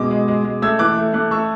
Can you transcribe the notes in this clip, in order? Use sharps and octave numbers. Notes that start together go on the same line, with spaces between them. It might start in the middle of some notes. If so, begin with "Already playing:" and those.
Already playing: B2 G#3 D6
G#3
G#3
G#3
A3 E6 G#6
E3 D6 F#6
A3
A3 D6 F#6
A3 C#6 E6